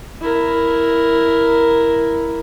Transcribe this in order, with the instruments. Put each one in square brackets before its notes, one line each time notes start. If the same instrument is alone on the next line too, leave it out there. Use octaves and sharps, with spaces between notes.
[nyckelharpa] E4 A#4